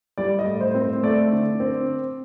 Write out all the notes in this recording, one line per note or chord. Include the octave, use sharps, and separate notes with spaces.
G3 D5
D#5
A2
C5
C4
C5
A3 D5
D3
C4